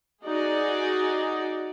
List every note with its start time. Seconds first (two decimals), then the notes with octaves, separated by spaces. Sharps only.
0.25 D#4 F#4 G#4 D5